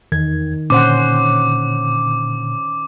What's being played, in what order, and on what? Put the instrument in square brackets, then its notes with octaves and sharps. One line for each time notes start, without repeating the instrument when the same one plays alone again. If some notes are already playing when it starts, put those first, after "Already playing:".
[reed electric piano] E2 G#6 [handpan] D#3
[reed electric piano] A#2 D3 [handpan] C#4 C5 F#5 [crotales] D6